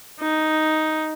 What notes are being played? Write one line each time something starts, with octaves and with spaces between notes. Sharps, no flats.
D#4